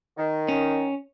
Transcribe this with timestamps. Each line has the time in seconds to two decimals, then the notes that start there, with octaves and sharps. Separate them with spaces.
0.18 D#3
0.48 C#4